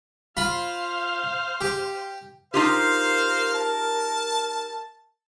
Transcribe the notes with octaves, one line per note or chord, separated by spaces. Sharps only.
F4 C5 F5 B5
G4
D#4 F4 G4 A#4 C5 F5
A5